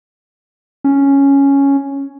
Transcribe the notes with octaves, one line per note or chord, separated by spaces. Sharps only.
C#4